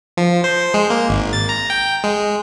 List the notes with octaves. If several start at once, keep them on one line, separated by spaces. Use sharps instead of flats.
F3
C5
G#3
A#3
G#1
A6
A#5
G5
G#3